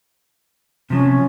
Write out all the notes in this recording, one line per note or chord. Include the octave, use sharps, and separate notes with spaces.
C3 F3 C#4